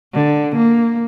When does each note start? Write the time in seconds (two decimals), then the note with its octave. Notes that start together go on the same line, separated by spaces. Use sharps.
0.14 D3
0.56 A#3